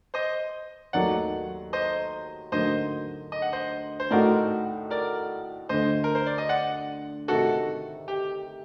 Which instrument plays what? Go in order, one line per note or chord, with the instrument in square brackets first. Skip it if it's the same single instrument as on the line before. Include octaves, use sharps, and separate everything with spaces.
[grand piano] C5 D#5
[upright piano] D#2 D#3 F#3 A3 [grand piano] D5 F#5
[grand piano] C5 D#5
[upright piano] D2 D3 F#3 A#3 D#4 [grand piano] C5 D#5
[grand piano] D#5
F#5
C5 D#5
C5
[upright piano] A2 A3 D#4 F#4 [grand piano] A#4 D5
[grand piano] A#4 D5
[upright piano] D2 D3 A3 [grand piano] C5 D#5
[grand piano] A#4
C5
D5
D#5
D5 F#5
[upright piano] C3 D#3 A3 [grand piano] F#4 A4
[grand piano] G4